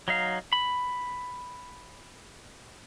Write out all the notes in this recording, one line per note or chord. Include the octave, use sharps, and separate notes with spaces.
F#3 D#4 F5
B5